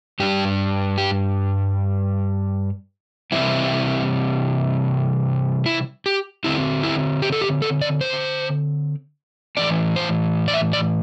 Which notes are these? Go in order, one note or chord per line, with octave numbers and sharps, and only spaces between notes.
G2 G3 D4 G4
G4
C3 E3 G3 C4 E4
E4
G4
D3 C4 E4
E4
G4
A4
G4
A4
D5
C5
A2 E3 C4 D5
C5
D5
E5
D5